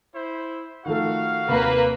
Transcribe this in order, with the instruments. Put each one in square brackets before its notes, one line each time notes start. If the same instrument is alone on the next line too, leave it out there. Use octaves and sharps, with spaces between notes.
[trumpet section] E4 C5
[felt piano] D#3 F3 A3 [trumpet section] F#4 F5
[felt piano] D#2 C3 [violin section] A#3 B4